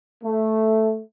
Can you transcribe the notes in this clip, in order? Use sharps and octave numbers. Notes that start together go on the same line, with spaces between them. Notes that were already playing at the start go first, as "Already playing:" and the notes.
A3